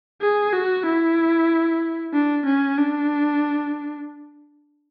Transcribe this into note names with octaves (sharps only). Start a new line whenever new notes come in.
G#4
F#4
E4
D4
C#4
D4